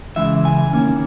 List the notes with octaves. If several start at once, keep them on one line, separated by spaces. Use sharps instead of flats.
C#3 E3 G#3 E5
G#5
D#3 A#3 C#4